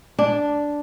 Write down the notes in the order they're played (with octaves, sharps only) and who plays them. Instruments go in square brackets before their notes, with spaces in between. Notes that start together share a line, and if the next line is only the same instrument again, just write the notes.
[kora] D4